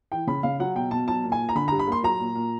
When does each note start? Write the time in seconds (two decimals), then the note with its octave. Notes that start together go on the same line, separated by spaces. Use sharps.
0.12 E3 G5
0.27 C#3 B5
0.43 C#3 F5
0.60 F#3 F#5
0.75 B2 G5
0.91 B2 A5
1.08 F#3 A5
1.24 A#2
1.32 G#5
1.39 A#2
1.49 A#5
1.55 D3 B5
1.68 A#5
1.72 G2
1.79 B5
1.87 A#3 C6
2.03 F#3 A#5
2.20 A#2
2.35 A#2